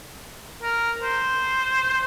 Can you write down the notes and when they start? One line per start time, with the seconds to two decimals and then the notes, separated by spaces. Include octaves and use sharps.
0.62 A#4
1.03 C5